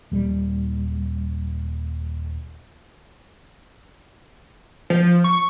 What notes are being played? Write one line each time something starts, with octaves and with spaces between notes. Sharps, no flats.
D#1 G3
F3
C#6